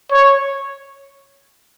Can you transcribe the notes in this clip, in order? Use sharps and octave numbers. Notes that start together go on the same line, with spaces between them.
C#5